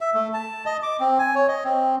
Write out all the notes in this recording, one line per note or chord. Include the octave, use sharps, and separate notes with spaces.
E5
A3
A5
D#5
D6
C4
G#5
C#5
D#5
C4